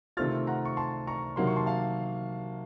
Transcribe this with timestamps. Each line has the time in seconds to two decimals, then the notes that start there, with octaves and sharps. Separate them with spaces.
0.17 C3 D#3 A3 C4 F4 F6 A6
0.47 F#5 A#5
0.65 C#6
0.77 A5 C6
1.07 A#5 C#6
1.36 C3 D#3 F#3 A#3 C6
1.47 C#6
1.56 A5 C6
1.66 F5 A5